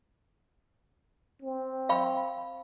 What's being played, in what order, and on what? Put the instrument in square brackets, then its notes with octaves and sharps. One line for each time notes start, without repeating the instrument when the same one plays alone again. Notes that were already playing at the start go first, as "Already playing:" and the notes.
[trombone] C4
[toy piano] F5 B5